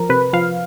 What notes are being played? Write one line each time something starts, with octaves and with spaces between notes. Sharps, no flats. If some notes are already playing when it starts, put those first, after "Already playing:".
Already playing: F3 A#4
C3 B4
F3 F5